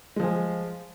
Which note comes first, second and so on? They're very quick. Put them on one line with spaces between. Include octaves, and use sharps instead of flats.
G#3 F3 G#4